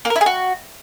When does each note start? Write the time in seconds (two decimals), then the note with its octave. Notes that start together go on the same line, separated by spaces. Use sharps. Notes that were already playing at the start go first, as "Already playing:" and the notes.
0.05 A#3
0.10 A#4
0.16 E4
0.21 G#4
0.26 F#4